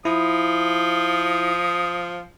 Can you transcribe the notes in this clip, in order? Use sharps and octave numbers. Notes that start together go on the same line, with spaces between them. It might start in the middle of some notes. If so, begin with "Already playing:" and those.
F3 E4 D#6